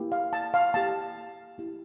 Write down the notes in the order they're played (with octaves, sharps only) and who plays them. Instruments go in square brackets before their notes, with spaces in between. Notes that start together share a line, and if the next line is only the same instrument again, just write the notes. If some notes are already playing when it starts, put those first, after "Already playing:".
Already playing: [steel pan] A#3 E4 G4
F5
A5
F5
A#3 E4 G4 A5
A#3 E4 G4